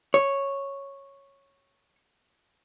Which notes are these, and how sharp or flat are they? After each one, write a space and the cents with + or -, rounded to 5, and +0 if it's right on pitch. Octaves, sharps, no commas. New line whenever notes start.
C#5 -5